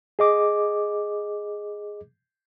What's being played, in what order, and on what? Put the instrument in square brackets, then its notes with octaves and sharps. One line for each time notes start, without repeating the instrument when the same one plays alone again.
[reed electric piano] G#4 D#5 D6